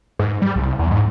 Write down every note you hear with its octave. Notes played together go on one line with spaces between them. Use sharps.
G#2
G3
C2
E2
G#2